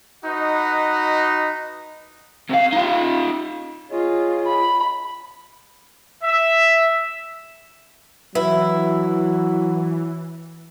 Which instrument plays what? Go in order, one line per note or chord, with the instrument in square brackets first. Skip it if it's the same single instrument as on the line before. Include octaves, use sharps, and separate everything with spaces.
[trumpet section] D#4 F#4 B4 D#5
[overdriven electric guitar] C3 F5
D#4 F4
[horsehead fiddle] F4 [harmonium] G#4 C#5 D#5
[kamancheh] B5
[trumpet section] E5
[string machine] E3 [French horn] F#3 [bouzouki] E4 [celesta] B4